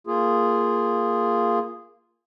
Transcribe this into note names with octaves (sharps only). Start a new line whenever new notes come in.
A#3 F4 G#4